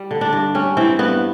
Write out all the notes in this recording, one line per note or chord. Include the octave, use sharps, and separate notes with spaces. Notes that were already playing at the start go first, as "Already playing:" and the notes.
Already playing: G3
D3
D4
G2
G3 C#4
E3 C4
G2 B3